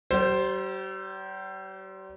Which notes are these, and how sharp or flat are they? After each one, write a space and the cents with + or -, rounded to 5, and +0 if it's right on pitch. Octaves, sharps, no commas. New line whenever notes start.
G3 -45 C5 +0